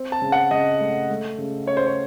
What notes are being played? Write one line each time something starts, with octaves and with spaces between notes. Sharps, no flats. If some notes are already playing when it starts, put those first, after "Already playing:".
Already playing: C4
A5
C#3
F#5
C#3 D#5
A3
A3
C#3
C#4 C#5
C5
C#5